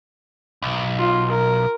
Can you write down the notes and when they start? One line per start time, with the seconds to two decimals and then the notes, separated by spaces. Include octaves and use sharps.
0.62 B1
0.98 F4
1.31 A#4